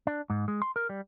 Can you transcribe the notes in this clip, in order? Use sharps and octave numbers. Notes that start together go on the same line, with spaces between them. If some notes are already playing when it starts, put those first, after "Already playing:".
D4
G#2
G#3
C6
A#4
G3